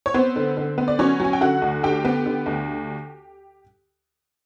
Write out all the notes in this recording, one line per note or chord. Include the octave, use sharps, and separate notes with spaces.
C#5
B3 C4 C5
D3
D3
B3
D5
F#3 C#4 C#5
F#3 G#5
G5
D3 F#4 F#5
D2
D3 G4 G5
B3
D3
D2